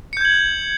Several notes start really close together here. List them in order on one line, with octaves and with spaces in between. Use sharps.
C#7 G6 G#6 F#7